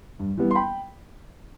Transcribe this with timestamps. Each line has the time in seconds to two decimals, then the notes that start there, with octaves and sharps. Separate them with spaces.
0.20 G2
0.37 E3 G3 B3
0.51 C6
0.55 G5 B5